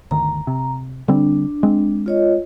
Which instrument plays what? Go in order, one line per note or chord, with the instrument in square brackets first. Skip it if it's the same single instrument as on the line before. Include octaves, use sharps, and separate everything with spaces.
[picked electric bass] G1 D2 D#3 [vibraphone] A#5
[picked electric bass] C3
[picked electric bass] D3 G3 C4 [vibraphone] D4
[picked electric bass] G#3 C4
[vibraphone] F4 C#5 D#5